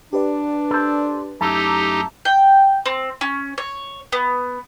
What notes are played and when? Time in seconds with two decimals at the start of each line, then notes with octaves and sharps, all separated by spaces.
0.13 D4 G4 B4 D5
0.71 A4 C5
1.41 F#2 A3 D#4 E4 G4 A5 A#5 D6
2.25 G5
2.86 C4
3.21 C#4
3.58 C#5
4.12 B3